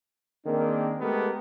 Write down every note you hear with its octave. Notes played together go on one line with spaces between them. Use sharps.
D#3 A#3 C4 D4 G#4
G#3 A3 B3 G4 A#4